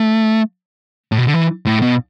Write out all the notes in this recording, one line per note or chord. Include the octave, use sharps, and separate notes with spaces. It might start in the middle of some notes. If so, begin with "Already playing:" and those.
Already playing: A3
A2
B2
D3
E3
A2
B2